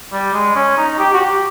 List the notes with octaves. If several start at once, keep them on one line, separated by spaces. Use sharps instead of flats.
G3
G#3
C#4
D#4
G4
F#4
G4